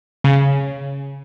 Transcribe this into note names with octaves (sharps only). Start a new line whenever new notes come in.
C#3